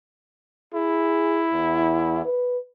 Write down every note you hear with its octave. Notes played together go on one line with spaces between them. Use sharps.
E4 G#4
E2
B4